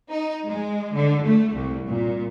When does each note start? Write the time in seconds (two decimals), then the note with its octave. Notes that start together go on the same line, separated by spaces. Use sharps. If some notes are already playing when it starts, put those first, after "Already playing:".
0.10 D#4
0.48 G#3
0.95 D3
1.25 A3
1.55 C2
1.88 A#2